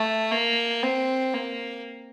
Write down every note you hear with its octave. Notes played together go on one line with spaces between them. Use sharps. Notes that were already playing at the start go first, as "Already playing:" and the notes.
Already playing: A3
A#3
C4
A#3